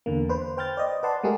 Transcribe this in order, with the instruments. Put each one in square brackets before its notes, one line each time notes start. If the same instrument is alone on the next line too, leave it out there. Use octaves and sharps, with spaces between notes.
[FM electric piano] E2 D3 A#3
B4 C5
C5 G5 F6 G6 A6
D5 D#5
B4 D5 F#5 A5 C6
G#3 A3 G4 G#4 A#4